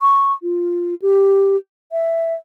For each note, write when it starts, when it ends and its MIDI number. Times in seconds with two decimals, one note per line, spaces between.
0.01 0.33 85
0.42 0.95 65
1.02 1.56 67
1.92 2.34 76